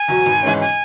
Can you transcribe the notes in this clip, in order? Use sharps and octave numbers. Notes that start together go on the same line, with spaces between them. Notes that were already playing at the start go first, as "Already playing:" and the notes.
Already playing: G#5
E2 B2 F#3
G#1
G#2 E3 G#3 C#4
G#5